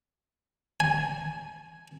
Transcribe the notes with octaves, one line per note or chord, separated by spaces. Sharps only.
G#5